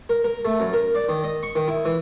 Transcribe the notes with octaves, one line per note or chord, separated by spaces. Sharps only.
A#4
A#4
A3
F#2
A#4
D5
D#3
D#5
C#6
D#3
E4
E3